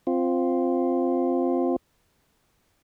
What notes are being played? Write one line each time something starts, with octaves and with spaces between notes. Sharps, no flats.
C4 F4